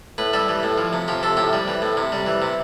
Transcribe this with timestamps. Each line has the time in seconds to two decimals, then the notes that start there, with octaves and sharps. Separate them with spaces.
0.18 A2 B4
0.33 G3 A4
0.48 E3
0.63 A2
0.78 F3
0.93 C3
1.08 F3 G4
1.23 C3 A4
1.37 A2 G4
1.53 G3
1.68 E3
1.82 A2
1.97 C3
2.12 G3
2.26 E3
2.42 C3